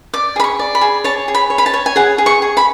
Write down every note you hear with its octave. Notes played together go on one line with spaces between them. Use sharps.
D5 D6
G#4 B5
C#6
D5
B5
G#4
C#5 A5
G#4
B5
C#5
B5
A5
C#5
G#5
G#4 F#5
G#4
C#6
G#4
B5